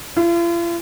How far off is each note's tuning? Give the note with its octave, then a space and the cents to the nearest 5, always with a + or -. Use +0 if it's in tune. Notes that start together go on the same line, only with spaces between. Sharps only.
F4 -45